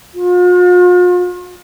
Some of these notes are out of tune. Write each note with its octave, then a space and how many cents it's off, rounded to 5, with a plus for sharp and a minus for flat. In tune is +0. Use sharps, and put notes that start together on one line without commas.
F4 +45